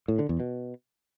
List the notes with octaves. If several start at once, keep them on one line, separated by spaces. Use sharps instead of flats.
A2
D3
E2
B2